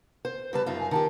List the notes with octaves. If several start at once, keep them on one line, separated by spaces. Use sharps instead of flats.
C5
C#3 G3 B4 A5
F#2 D#4 F4 E5
G#5
D#3 F4 G4 A5